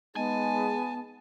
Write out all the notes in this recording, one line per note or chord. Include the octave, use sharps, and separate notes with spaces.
G#3 B3 D#4 G#4 G#5 A5